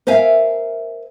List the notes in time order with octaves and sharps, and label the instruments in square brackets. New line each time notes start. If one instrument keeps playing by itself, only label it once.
[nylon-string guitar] A#4 C5 E5 F5 G#5